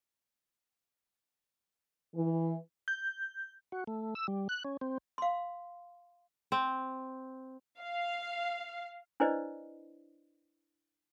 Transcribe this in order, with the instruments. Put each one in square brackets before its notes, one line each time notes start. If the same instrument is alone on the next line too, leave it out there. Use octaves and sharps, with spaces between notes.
[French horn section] E3
[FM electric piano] G6
[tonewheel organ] F#4
A3
E6
G3
F#6
C#4
C4
[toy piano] F5 C6
[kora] C4
[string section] F5
[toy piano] D4 E4 B4 C5 D5 D#5